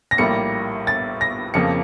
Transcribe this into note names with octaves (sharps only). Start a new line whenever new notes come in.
A#6
A#1 A2 G3 A#3 C#7
A6
A#6
F2 C#3 F3 A#3 C#7